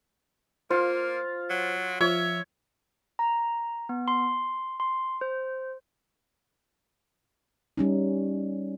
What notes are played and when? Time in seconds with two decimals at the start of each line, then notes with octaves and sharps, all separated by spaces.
0.70 A#3 F4 C5
1.50 F#3
2.01 F3 C#5 E5
3.19 A#5
3.89 B3
4.08 C6
4.80 C6
5.21 C5
7.77 G3 C#4 D#4